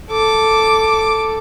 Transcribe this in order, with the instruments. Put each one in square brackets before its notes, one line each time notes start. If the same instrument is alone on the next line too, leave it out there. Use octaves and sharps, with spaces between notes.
[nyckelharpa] A4 [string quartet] D6